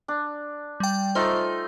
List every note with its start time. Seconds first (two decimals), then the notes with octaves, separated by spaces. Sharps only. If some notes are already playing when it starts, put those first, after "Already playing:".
0.08 D4
0.80 G3 G5
1.15 A3 D#4 F4 C5